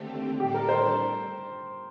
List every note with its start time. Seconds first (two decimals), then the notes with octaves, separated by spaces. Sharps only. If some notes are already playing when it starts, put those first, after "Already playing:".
Already playing: D#2 D3 A3 C4 G4
0.40 A2 G3 D4 G4 A4
0.54 A#4
0.69 C5